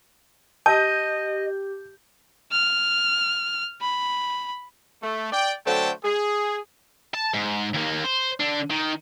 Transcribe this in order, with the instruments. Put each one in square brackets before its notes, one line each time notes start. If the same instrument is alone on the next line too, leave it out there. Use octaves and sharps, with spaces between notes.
[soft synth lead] G4 [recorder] D#5 [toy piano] A5 [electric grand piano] G6
[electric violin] F6
B5
[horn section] A3
D5 G5
D3 F#3 A3 C5 G5 A5
G#4
[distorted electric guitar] A5
G#2
D#2 A#3
C5
D3 D4
D#3